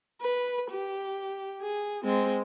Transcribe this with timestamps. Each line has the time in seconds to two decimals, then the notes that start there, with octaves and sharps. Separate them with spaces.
0.22 B4
0.70 G4
1.61 G#4
2.04 G#3 C4